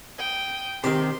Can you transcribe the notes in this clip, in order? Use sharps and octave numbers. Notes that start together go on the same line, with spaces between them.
G5 D#6
C3 D#3 G4 C6